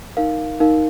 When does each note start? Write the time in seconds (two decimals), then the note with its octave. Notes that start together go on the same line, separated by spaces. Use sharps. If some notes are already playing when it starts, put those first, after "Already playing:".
0.17 D#4 A#4 F5
0.60 D#4 A#4 F5